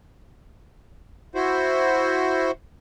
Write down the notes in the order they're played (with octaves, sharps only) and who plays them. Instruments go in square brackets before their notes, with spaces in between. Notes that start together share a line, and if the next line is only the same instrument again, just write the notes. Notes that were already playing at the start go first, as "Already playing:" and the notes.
[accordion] E4 F#4 C5